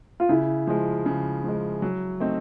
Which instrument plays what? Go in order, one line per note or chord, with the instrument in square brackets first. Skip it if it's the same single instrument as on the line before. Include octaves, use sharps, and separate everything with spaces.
[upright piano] F4
[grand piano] C#3 [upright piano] E4
[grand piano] F3 G#3
C#3
F3 G#3
F#3
A3 C4 D#4